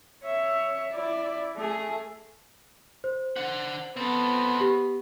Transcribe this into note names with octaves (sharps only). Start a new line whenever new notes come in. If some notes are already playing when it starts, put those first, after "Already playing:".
C#5 E5
E4 D5
A3 G#4
C5
D4 F#5
B3 C4 A4
G4